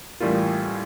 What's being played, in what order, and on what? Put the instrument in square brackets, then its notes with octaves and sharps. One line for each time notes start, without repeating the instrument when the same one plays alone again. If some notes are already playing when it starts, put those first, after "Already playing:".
[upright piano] A1 A2 G3 A#3 F4